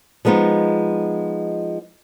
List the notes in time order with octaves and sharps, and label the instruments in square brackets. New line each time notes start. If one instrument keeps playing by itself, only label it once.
[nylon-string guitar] F3 G#3 B3 D#4 F4